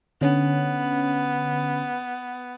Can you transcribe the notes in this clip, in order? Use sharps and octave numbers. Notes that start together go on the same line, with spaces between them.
D3 B3 C#4